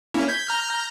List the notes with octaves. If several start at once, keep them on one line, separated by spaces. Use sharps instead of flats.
A#3 C#4 E4
G6 G#6 B6
A#5 F6 G6